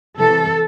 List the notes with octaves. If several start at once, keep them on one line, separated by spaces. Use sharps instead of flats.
C3 E3 A4